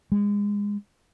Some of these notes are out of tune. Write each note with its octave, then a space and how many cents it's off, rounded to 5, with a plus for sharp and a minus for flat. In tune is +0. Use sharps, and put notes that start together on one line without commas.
G#3 -25